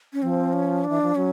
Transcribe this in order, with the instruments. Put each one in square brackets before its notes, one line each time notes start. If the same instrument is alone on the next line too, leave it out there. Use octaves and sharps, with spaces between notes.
[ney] C#4
[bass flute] F3 [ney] C4
[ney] C#4
D4
[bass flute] E3
F3
[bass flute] F#3 [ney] C#4